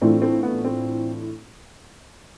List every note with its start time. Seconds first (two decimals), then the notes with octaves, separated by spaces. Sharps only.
0.01 A2 E3 A3 C4 D4 F4
0.22 C4
0.43 B3
0.65 C4